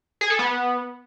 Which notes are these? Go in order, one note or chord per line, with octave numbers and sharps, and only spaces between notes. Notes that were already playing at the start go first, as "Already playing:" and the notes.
G#4
A4
B3